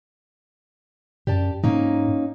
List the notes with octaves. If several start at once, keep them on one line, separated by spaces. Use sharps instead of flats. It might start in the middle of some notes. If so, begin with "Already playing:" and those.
F#2 G4 D5 A5
G#2 A#3 C#4 D#4